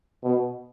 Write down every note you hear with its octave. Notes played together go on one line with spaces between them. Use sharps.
B2